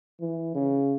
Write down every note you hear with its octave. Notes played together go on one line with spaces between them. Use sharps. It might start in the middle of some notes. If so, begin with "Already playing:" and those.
E3
C#3